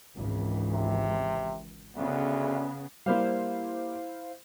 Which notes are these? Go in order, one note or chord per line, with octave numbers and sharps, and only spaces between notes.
G#1 C#2 E3
C3
D2 C#3 B3
G3 A#3 E4 C5 F5